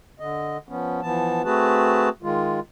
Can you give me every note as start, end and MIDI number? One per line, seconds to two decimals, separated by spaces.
0.20 0.57 50
0.20 0.57 75
0.69 1.01 53
0.69 1.01 59
0.69 1.01 61
1.02 1.42 52
1.02 1.42 53
1.02 1.42 59
1.02 1.42 81
1.45 2.09 57
1.45 2.09 60
1.45 2.09 66
1.45 2.09 68
1.45 2.09 71
1.45 2.09 81
2.23 2.60 51
2.23 2.60 56
2.23 2.60 65